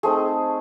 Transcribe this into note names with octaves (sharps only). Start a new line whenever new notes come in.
A3 C4 D#4 G#4